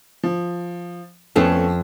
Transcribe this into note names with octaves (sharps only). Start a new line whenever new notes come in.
F3
F2 A3 B3 C#4 A4 F5